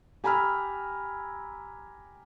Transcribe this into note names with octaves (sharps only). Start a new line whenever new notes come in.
G4 G#5 A#5 B5 E6 F6